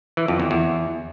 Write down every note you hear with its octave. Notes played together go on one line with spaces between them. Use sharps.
E3
F2
E2
E2